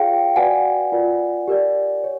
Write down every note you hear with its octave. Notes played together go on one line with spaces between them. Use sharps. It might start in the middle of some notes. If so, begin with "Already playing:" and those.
Already playing: F4 G#4 C#5 F5 G5
F#4 B4 D5 F#5 G#5
F4 A#4 D5
G4 A#4 D5
C#5